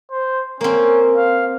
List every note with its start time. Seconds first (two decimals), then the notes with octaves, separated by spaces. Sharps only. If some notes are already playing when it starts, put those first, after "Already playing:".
0.11 C5
0.61 A#3 C4 C#4
1.16 F5